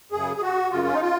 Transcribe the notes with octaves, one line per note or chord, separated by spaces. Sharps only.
F#2 C#3 G#4
G#4
F#4
F#2 C#3 F4
C#4
D#4
F4